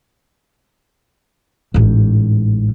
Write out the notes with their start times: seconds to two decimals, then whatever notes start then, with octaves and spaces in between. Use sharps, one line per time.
1.74 A1 G#2